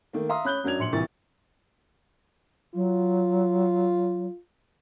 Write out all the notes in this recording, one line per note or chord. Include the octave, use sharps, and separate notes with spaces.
D#3 A3 A#3
E5 F5 A#5 C6 D#6
C#4 B5 F#6 G6 G7
F#2 F#3 D4 G#6 F7
A#1 C6 C#7 F#7
C2 A#2 E3 G4 C#6 A6
F#3 F4